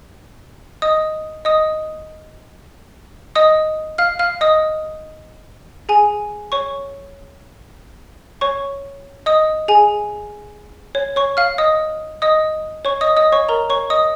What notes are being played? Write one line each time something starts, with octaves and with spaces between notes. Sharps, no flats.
D#5 D#6
D#5 D#6
D#5 D#6
F5 F6
F5 F6
D#5 D#6
G#4 G#5
C#5 C#6
C#5 C#6
D#5 D#6
G#4 G#5
C#5
C#5 C#6
F5 F6
D#5 D#6
D#5 D#6
C#5 C#6
D#5 D#6
D#5 D#6
C#5 C#6
A#4 A#5
C#5 C#6
D#5 D#6